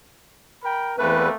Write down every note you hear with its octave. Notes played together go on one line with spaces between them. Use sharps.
A#4 G5 B5
E2 A3 A#3 C4 B4